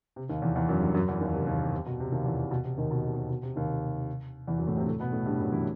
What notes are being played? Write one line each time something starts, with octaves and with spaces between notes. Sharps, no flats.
C3
D#2 D#3
E2 E3
E2 E3
F#2 F#3
G2 G3
F#2 F#3
E2 E3
D#2 D#3
C3
D#2 D#3
C3
C3
B2
C3
D#2 D#3
E2 E3
C3
B2
C3
D#2 D#3
B2
C3
C3
B2
C3
D#2 D#3
E2 E3
F#2 F#3
A2 A3
C3 C4
A2 A3
B2 B3
A2 A3
G2 G3
F#2 F#3
E3 E4